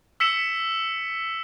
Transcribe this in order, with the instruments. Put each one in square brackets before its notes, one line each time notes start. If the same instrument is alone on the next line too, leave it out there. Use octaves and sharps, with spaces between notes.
[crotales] E6 B6 C#7 E7 G7